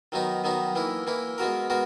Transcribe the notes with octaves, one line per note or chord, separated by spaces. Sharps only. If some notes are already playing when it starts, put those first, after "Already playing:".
D#3 F#3 B3 D#4
D#3 F#3 B3 D#4
E3 A#3 E4
E3 A#3 E4
G#3 B3 F#4 A#4
G#3 B3 F#4 A#4